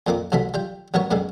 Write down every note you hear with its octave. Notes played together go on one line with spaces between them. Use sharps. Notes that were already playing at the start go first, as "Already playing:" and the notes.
F2 A#2 D#3 A#3 D6
C2 B2 F#3 A3 B5
G3 F4 G5
A1 F#3 B3 A#4 C#5
F#2 B2 D3 D#3 G#3